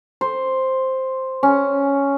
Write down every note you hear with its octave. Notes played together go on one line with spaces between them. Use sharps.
C5
C#4